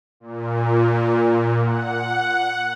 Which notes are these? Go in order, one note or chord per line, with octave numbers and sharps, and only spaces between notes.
A#2
F#5